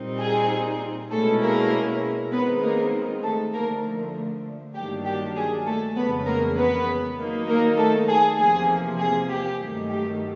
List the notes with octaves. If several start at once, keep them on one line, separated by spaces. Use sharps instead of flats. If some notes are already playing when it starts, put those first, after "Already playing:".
Already playing: A#2 G3 C4 D#4
G#4
B2 G#3 A3 C#4 E4 A4
A#3 A#4
D#3 G#3 B3 C4 D#4 B4
A#3 A#4
A3 A4
D3 F3 A3 A#3 A#4
G2 D#3 F#3 A#3 D4 G4
G4
G#4
A3 A4
F2 C#3 E3 G#3 B3 C#4 B4
A#3 A#4
B3 B4
D#3 F#3 A#3 D#4
A#3 A#4
A3 A4
G#4
E2 C3 F3 A#3 G#4
G#4
G4
G2 D#3 F#3 A3
G4